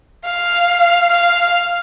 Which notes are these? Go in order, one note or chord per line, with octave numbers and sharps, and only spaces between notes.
F5
F5